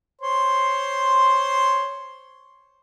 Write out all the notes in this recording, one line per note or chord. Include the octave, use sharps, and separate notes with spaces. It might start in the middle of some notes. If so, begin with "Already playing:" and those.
C5 C#5 C6